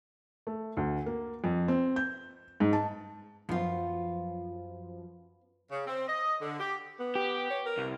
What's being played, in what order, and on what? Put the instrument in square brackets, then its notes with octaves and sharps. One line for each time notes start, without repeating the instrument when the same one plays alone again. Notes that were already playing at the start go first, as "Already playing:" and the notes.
[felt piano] A3
D2
A#3
F2
C4
G6
G#2
A5
[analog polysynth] F#2 F3 [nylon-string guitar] B3 F4
[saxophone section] C#3
C4
D#5
D3
G4
[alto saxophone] B3
[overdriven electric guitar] G4
[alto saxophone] C#5
A#4
[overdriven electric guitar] C2